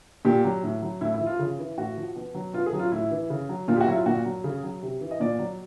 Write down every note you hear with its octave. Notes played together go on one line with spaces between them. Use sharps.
A#2 G4
F#3
A2
F#3
A2 E4
E4
F3
F4
C#3
E3
A2 F#4
F3
B2
F#3
B2 F4
G#4
F#3
F4
A2 E4
E3
C#3
F#3
A#2 F4
G4
F#4
F#3 E4
F4
A#2 F#4
F#3
C#3 G#4
F#3
C3
E3
D#5
A#2 D5
F#3